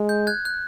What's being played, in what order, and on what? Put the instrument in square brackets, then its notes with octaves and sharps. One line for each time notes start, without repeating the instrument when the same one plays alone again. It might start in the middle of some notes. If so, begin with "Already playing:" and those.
Already playing: [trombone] G#3
[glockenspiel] G6
F#6 G#6
F#6